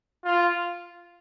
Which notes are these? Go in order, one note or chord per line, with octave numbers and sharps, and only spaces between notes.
F4